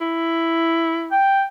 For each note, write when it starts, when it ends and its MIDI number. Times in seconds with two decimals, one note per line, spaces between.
0.01 1.17 64
1.12 1.45 79